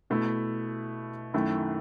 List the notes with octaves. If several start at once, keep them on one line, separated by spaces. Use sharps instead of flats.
B2 A3 E4
F#2 D#3 A3 E4